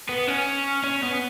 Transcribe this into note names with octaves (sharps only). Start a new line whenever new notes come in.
B3
C#4
C#4
B3